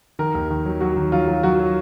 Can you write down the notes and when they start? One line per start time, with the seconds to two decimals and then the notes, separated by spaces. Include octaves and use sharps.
0.19 D#3 A#4
0.34 D#2
0.50 D#3
0.65 F#3
0.81 F#3 F#4
0.97 D#3
1.12 F#3 F4
1.28 F#3
1.43 F#3 F#4
1.59 F#3